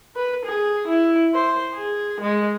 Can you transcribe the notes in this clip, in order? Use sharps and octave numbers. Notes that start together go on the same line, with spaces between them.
B4
G#4
E4
C5
G#4
G#3